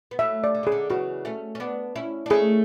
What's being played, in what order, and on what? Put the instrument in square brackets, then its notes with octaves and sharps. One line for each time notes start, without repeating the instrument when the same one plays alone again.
[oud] B3
[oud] F#3 A3 [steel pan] E5
[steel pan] D5
[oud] D3
[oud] C#3 [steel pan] G#4
[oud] D3
[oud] C#3 E3 [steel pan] F#4
[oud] A3 C#4
C#4
B3 D4
C#4 E4
D4
[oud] A3 C#4 [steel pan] G#4